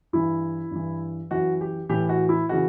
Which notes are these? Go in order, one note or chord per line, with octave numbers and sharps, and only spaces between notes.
G2 E3 E4
G2 E3
F#2 E3 F#4
G4
A2 E3 G4
F#4
E4
C#3 E3 F#4